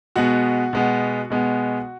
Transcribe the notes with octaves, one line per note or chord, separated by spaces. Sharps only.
B2 G#3 B3 F#4 F#5
B2 G#3 B3
B2 G#3 B3